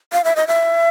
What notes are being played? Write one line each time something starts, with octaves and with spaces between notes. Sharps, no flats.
F5
E5
D#5
E5